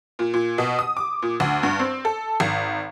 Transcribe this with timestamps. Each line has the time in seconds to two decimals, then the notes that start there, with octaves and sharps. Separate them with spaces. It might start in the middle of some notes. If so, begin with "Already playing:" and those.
0.19 A#2
0.34 A#2
0.58 B2
0.79 D#6
0.97 D6
1.22 A#2
1.40 D2
1.63 G2
1.79 C4
2.05 A4
2.40 G#1